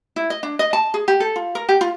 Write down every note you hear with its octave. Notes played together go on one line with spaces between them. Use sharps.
E4
D#5
D4
D#5
A5
G#4
G4
A4
F4
A#4
G4
F4